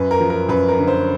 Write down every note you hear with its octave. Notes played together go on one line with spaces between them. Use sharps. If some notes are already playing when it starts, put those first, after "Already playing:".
Already playing: F#2 B4
A#4
F3
A#4
F#2 B4
A#4
D3
C5